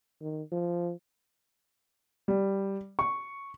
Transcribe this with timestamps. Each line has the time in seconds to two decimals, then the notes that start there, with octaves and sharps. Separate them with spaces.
0.21 D#3
0.52 F3
2.28 G3
2.99 C#6